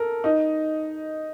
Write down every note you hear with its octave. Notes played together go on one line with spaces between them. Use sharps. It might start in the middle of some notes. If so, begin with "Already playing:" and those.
Already playing: A4 A#4
D#4 D#5